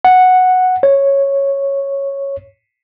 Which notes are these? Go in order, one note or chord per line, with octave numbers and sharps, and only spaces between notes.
F#5
C#5